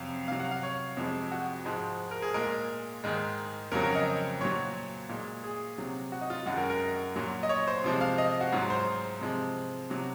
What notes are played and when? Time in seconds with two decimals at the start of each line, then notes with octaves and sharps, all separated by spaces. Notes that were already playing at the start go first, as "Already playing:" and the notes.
Already playing: F2 C3 F#3 F5
0.28 C3 F#3 F5
0.40 F#5
0.51 F5
0.63 C#5
0.97 F2 C3 F3 G#3
1.32 F#4
1.65 G#2 F3 G#3
2.11 A#4
2.22 G#4
2.34 A#2 G#3 A#4
3.04 G#2 D#3 G#3
3.72 F2 C#3 F#3 A#4
3.83 A#4
3.95 D#5
4.41 A#2 F#3 C#5
5.09 A#2 G#3
5.44 G#4
5.78 C3 F#3
6.12 F#4
6.21 D#4
6.30 F4
6.46 F#2 D#3 G#3 F#4
6.58 A#4
6.70 A#4
7.16 A#2 F#3
7.43 D#5
7.49 C#5
7.68 C5
7.84 C3 F3 G#3
8.01 F5
8.18 D#5
8.41 F#4
8.52 G#2 F#3 F4
8.70 C5
9.21 C3 F3 G#3
9.90 C3 F#3